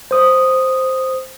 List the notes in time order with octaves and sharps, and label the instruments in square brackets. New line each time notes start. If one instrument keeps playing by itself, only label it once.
[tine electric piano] C5 D#6